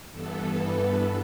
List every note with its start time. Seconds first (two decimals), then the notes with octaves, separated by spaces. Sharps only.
0.11 G2 E3 B3 A4
0.50 B4
0.90 A4